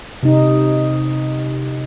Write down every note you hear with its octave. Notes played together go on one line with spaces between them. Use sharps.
C3 D#4